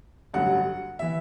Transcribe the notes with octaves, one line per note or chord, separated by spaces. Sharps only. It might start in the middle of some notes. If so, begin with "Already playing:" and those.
A1 G2 D3 F#3 F#5
E3 E5